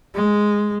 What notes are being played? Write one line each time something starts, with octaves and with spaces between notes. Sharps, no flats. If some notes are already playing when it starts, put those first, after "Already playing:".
G#3